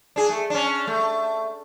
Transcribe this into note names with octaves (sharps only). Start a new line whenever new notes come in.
D4 G#4
A3
C#4 D4
A3